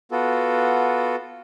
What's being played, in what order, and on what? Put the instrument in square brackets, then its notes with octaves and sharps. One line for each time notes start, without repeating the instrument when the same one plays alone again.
[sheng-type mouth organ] B3 F4 F#4 A4